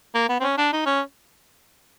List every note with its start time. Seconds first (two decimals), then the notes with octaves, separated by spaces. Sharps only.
0.15 A#3
0.29 B3
0.40 C4
0.43 C#4
0.58 D4
0.72 D#4
0.86 C#4